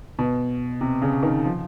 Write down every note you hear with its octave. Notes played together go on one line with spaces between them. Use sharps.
B2
C3
C#3
D#3
F3